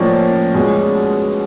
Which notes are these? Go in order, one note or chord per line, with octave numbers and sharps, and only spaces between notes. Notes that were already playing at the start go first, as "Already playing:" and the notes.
Already playing: A2 F3 A#3 C#4 D5
B2 G#3 C#4